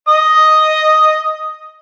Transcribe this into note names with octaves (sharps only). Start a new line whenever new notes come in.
D#5 D#6